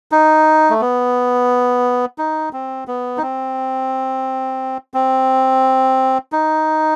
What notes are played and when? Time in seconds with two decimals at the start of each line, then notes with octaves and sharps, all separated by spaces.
0.12 D#4
0.70 A3
0.81 B3
2.18 D#4
2.53 C4
2.88 B3
3.18 D#4
3.22 C4
4.94 C4
6.32 D#4